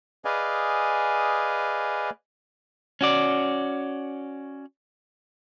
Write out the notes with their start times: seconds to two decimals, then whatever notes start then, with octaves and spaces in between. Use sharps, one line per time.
0.25 G#4 B4 D5 D#5 F5 G#5
3.01 C#4 F#4 D5